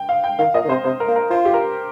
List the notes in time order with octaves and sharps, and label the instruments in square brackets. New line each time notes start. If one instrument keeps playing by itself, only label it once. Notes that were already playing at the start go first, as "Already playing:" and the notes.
Already playing: [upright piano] G5
F5
G5
[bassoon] D#3 [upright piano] F5
[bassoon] A#2 [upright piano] D#5
[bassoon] D#3
[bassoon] C3 [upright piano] C5
[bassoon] C3 [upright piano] C5
[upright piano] A#4
[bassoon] A#3
[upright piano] A#4
[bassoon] F4 [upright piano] C5
[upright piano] G4
A#4